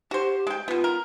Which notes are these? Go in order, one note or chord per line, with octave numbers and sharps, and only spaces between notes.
F#4 G4 C5
G#3 G5
B2 B3 F4
A#4